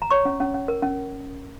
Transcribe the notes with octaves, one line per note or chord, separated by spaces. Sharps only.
A#5
C#5 C#6
C#4
C#4
C#4
A#4
C#4